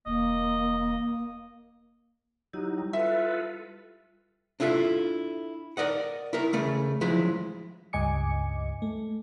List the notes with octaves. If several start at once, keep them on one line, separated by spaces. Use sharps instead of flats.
E1 A#3 D#5
F#3 D#4 E4 G4
G3
F4 A4 B4 E5
D4 E4 F4 A4 E5
A#4 D5 D#5 F#5
E4 A#4
C#3 A3 C#4
F3 F#3 G#3 E4
C#2 G2 D#5 G#5 D6 C#7
A3